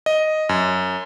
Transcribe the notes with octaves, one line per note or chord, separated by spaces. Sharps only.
D#5
F#2